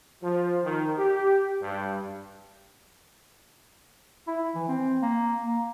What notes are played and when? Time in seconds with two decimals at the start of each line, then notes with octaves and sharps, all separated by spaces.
0.23 F3
0.64 D#3
0.98 G4
1.62 G2
4.28 E4
4.55 E3
4.68 C4
5.02 A#3
5.44 A#3